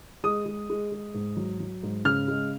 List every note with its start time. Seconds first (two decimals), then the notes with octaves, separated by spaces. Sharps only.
0.24 G#3 D#6
0.46 G#3
0.70 G#3
0.92 G#3
1.14 G#2
1.37 F#3
1.60 F#3
1.83 G#2
2.05 C#3 F6
2.28 G#3